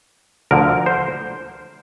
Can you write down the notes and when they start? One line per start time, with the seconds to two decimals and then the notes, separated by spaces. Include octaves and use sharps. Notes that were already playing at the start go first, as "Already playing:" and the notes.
0.51 D2 D3 F3 A#4
0.86 C5